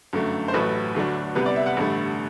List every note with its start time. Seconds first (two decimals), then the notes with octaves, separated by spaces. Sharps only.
0.13 G1 F#2 D3 A3
0.48 C5
0.53 A1 A2 F#3 A3 B4
0.95 D2 D3 F#3 A3 D4
1.35 C2 C3 G3 B3 B4
1.46 D5
1.56 E5
1.66 F#5
1.77 A1 G2 D3 A3